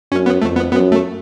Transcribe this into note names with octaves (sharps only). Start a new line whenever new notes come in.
F#2 C#4
B3
F2 A3
B3
F#2 B3
A3